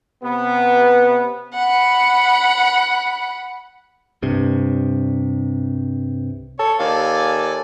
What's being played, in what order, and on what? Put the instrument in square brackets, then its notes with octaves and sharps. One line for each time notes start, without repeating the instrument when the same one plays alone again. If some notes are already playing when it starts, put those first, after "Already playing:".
[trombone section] C3 B3
[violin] F#5 B5
[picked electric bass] C2 G2 C3
[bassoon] A4 [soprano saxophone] C#5
[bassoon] D#2 [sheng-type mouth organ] A4 D5 G#5 [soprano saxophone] F5